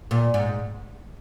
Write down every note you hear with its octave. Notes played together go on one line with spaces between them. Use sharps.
A#2
G#2